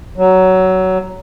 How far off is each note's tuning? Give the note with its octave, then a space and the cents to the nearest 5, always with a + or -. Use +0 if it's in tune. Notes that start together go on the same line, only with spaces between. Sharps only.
F#3 +15